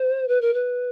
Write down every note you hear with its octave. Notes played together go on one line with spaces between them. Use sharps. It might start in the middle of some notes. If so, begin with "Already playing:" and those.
Already playing: C5
B4
A#4
B4